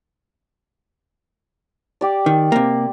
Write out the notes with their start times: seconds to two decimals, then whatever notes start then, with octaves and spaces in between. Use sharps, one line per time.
2.01 G4 D5
2.26 D#3
2.52 C3 A#3